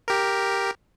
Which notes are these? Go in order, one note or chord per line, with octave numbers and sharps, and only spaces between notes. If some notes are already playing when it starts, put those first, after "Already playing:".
G4 A#4